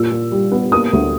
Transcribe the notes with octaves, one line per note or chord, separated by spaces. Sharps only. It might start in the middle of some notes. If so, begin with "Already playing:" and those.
Already playing: A#2 E6
A#2
G3
B3
A#3 D#6
D2